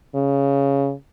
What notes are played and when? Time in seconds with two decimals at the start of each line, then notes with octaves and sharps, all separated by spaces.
0.15 C#3